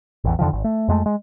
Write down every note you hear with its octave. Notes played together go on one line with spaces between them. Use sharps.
A1 E2
F2 D3 D#3 F3
G#1
A3
F2 G#3 A3
G#3